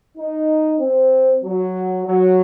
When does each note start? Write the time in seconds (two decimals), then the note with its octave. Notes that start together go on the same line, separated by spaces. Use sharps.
0.18 D#4
0.80 C4
1.43 F#3
2.06 F#3